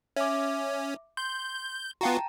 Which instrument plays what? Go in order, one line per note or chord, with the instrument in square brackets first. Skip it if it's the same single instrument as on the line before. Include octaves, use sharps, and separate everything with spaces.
[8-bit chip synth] C#4 [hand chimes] E5 D6
[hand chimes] C6 [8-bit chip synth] G6
[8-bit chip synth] B3 F4 F#4 [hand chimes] G5 A5 A#5